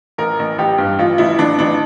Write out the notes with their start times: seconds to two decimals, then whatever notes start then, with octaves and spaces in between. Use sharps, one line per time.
0.18 A1 A#4
0.39 A1
0.58 A1 G4
0.78 G2
0.99 A1 F4
1.18 A1 E4
1.39 A1 D4
1.59 A1 D4